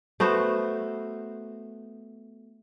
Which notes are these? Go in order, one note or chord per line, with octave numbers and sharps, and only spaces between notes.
A3 B3 F#4 C5